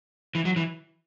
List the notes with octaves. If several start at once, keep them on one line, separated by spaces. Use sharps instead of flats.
E3
F#3
E3